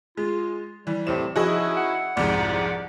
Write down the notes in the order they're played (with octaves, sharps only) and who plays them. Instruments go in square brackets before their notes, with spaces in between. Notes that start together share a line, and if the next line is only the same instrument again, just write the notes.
[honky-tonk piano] G#3 [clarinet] F4
[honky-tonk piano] E3 [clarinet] G3
[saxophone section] A2 C3 [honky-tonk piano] E7
[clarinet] F3 [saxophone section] C#4 D#4 E4 [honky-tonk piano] F#4 G#4 D#5
[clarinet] F#5
[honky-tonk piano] C2 F2 G#2 [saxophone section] D5